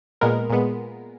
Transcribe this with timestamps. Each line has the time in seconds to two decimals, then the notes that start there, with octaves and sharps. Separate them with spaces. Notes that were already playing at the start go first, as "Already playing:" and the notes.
0.21 A#2 G#3 B3 A#4
0.50 A#2 G#3 B3